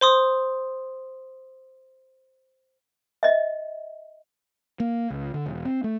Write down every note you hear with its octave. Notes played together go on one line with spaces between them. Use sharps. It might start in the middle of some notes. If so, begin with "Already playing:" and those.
C5 C6 D#6
D#5 E5
A#3
C#2
D3
E1
C4
A3